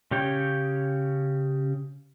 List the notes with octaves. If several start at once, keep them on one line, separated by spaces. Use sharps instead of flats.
C#3 C#4 G4 C#5 G5